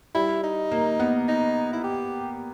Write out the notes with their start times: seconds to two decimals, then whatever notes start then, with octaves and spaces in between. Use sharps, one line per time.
0.15 G3 E4
0.44 D#4
0.71 A#3
1.00 B3
1.28 D#4
1.73 E4
1.84 G4